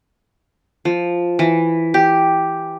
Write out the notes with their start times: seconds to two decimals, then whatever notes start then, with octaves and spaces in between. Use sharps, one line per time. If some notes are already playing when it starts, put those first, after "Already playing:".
0.85 F3
1.39 E3
1.94 G4